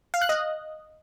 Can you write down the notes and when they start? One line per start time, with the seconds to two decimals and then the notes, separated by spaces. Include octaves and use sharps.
0.14 F5
0.21 F#6
0.29 D#5